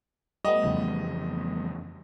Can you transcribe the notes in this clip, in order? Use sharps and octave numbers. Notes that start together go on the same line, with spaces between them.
G3 A3 B3 D#5
F2 C#3 E3